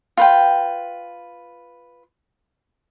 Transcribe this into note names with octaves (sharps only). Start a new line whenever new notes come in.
F4 B4 G5